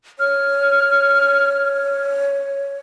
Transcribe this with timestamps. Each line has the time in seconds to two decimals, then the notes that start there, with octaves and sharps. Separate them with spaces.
0.19 C#5 F6